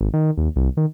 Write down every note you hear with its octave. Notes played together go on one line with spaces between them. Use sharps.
G#1
D#3
D#2
C2
D#3